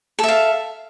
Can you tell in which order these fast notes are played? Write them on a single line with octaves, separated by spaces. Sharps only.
A4 E5 F5